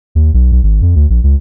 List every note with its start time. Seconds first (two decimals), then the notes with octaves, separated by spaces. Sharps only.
0.15 D#2
0.34 B1
0.52 B1
0.63 G#1
0.82 F2
0.96 D2
1.10 A#1
1.24 C#2